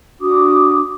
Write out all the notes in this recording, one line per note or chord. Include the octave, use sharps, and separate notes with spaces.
D4 F#4 D6 D#6